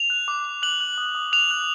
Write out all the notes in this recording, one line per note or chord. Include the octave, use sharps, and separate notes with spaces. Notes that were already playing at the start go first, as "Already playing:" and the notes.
Already playing: F7
F#6
D6
D6
F#6 F#7
F#6
D#6
D#6
F#6 F7
F#6